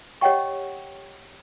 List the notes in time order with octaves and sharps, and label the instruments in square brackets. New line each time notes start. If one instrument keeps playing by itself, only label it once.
[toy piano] G4 C#5 D#5 F#5 G5 C#6